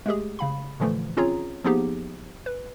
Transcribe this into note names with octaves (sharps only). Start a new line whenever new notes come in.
G#3 A3 G4 G#4
C#3 F5 B5
A#2 D3 E3 F3 A3
C4 C#4 F4 G#4 C#5 A#5
F3 A#3 B3 D#4 G4 G#4
B4